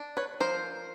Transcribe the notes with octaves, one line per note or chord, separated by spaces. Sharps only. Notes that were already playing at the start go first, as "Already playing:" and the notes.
Already playing: D4
B4 C#5
F3 A#4 C5